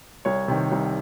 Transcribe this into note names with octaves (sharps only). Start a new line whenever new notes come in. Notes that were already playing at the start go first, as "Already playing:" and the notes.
C2 C#5
C3 D#3
C2